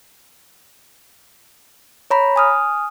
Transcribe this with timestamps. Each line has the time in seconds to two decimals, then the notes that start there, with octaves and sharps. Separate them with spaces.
2.11 C#5 A#5 B5
2.36 G#5 D#6 F6